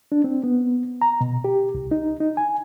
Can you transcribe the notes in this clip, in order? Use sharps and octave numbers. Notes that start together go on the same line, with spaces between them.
D4
C4
B3
A#5
B2
G4
C2
D#4
D#4
G#5